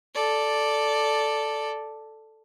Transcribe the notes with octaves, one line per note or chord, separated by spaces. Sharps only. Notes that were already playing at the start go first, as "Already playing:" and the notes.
A4 D5